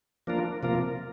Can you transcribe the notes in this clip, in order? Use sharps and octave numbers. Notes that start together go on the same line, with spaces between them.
F3 A#3 D4 F4 A#4
C3 F3 A#3 F4 A#4